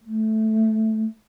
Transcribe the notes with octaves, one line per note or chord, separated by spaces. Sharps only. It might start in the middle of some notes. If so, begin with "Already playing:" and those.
A3